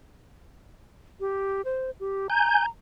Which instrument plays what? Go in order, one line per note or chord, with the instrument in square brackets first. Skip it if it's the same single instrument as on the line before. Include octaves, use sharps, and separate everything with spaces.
[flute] G4
C5
G4
[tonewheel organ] G#5 G6 [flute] A#5